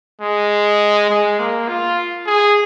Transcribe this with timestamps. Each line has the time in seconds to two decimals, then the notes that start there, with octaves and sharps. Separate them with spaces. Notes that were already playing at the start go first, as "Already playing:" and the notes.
0.21 G#3
1.10 G#3
1.39 A#3
1.68 F4
2.27 G#4